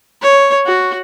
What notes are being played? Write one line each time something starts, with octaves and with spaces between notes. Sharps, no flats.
C#5
F#4